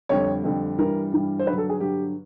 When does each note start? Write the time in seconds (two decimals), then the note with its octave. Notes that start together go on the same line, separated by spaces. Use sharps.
0.09 F2 D3 G3 C#5
0.44 F2 D3 G3
0.78 G2 E3 G3 A#4
1.12 G2 E3 G3
1.39 C5
1.47 G2 D3 F#3 B4
1.58 A4
1.69 G#4
1.80 G2 D3 F#3 G4